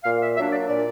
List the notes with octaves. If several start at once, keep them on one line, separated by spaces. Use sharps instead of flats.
A#2 F5
E5
F#3 A#3 D4 E5
D5
A#2 D5